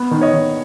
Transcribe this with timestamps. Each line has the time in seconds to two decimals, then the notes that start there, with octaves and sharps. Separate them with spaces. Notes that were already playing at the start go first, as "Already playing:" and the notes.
Already playing: B3
0.11 D#3
0.21 C#5 D#5
0.33 D#3